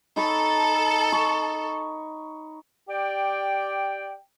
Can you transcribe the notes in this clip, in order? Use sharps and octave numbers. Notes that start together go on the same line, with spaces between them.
D#4 A4 C#5 B5
C#6
G4 D5 G5